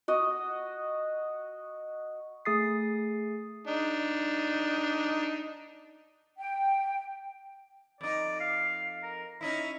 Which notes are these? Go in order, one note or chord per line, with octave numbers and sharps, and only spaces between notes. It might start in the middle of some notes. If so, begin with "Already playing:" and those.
F#4 D#5
A3 G#4 D#6 A6 C7
D4 D#4
G5
F2 D#4 D5
F5
A#4
C#4 D#4 E4 B5